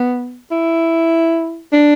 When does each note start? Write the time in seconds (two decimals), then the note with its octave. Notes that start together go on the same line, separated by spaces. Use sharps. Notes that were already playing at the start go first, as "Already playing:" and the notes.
Already playing: B3
0.51 E4
1.73 D4